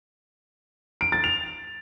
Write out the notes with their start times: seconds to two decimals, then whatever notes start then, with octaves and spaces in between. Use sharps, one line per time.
1.01 D7
1.12 A6
1.24 F7